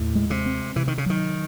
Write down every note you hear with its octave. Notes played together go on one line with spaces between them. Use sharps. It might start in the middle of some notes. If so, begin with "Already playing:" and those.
Already playing: D#2 A2
G#3
C3
C4
C3 E3
D#3
C#3
D#3 F#3